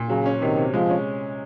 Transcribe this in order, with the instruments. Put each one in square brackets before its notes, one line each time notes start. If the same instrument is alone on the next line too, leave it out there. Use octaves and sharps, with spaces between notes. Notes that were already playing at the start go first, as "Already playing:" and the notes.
Already playing: [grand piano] A#2
[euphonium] C#3 [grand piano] F#3
[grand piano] C#4
[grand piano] C3 [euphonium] D#3
[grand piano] C3
[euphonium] F3 [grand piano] G#3
[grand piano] C#4